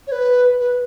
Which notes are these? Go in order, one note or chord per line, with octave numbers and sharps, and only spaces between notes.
C#5
B4
B4